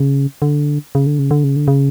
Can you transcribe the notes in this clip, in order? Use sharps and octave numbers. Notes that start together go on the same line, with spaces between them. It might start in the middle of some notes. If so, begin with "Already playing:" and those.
Already playing: C#3
D3
C#3
D3
C#3
D3
C#3
D3
C#3